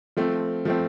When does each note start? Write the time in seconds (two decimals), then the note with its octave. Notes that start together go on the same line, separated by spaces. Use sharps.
0.17 F3 A3 C4
0.65 F3 A3 C4